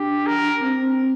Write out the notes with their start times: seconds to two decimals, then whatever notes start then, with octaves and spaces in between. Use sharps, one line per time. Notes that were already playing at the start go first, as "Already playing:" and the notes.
Already playing: D4 G4
0.27 A#4
0.61 C4